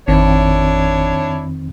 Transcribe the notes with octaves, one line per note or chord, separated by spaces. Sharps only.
G#1 F2 D#3 C4 D4 E4 C#5